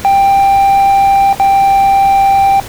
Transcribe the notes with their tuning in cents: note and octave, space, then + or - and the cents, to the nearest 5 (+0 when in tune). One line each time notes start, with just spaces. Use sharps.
G5 +10
G5 +5